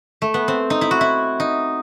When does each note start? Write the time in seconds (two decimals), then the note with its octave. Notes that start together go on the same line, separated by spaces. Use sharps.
0.22 A3
0.34 B3
0.48 C4
0.70 D#4
0.81 E4
0.91 F#4
1.01 E4
1.40 D#4